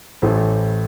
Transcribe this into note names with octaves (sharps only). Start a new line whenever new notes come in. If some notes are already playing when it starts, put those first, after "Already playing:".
A1 A2 A3 C5